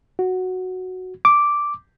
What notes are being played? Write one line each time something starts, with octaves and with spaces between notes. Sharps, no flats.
F#4
D6